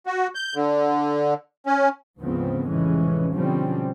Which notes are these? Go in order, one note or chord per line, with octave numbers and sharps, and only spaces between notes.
F#4
G6
D3
C#4
D2 G#2 C#3 F3 B3 C4
F1 A2 C#3 E3 G#3 C#4
B2 D3 F3 G3 C4 C#4